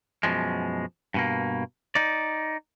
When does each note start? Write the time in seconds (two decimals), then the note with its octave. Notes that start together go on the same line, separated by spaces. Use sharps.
0.23 F#2 B2 D3 F3 G#3
1.14 G2 B2 A#3
1.95 D#4 D5